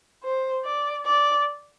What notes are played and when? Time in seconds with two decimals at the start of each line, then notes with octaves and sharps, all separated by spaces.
0.24 C5
0.64 D5
1.06 D5